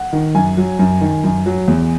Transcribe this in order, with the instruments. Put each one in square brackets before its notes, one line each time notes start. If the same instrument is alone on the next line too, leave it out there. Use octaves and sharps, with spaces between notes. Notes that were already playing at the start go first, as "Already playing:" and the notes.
Already playing: [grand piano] F#5
D#3
F#2 G#5
F#3
F#2
D#3
F#2
F#3
E2